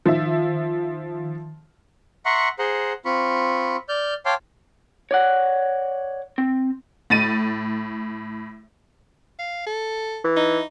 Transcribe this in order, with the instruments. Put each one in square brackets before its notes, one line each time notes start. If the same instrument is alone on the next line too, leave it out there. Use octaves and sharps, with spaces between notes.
[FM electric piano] D#3 [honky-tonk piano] F3 E5
[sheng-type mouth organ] E5 F#5 A#5 C6 C#6
G#4 C5 F#5 A#5 C6
C4 F4 B5 C#6
D5 F6 G6
C#5 F5 G5 A5 C6 D6
[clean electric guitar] C#5 D5 F#5
C4
[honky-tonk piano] A2 A6 D#7
[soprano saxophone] F5
A4
[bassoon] E3
[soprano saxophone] D#4